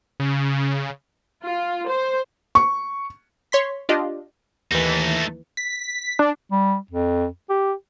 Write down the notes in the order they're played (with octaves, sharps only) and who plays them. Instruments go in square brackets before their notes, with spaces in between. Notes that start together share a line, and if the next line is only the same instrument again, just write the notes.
[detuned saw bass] C#3
[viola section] F4
C5
[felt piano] C#6
[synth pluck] C#5 C6 B6
D4 F4 G4 D#5
[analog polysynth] D#2 E3 [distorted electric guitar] A3 D#4
[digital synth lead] B6
D4
[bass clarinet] G3
F2
G4